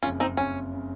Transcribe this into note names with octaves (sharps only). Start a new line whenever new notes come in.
F#1 F2 C#3 C#4 F4
C4 D#4
F#1 F2 C#3 C#4
C#3